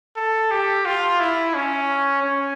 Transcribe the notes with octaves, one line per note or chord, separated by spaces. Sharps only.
A4
G4
F4
E4
C#4
C#4